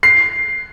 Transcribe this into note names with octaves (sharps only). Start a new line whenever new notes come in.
C7